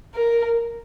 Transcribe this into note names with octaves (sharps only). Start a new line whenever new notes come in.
A#4